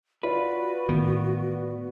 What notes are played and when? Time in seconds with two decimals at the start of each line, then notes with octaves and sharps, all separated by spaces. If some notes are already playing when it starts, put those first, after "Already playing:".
0.23 F4 F#4 B4 D5
0.89 A2 D#3 B3